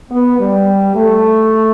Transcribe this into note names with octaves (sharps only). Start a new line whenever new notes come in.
B3
G3
A3